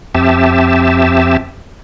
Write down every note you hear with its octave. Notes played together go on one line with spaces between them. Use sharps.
F2 C4 G4 E5 A5